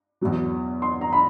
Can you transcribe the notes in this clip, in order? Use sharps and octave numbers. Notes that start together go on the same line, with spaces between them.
E2 B2 F#3
C6
A#5
B5